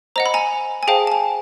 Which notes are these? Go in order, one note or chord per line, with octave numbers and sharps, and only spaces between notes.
C5 D#5 F#5 A#5
B5
G#5 A#5
G#5
G#4 C5 F5 G5 A5
A5
G#5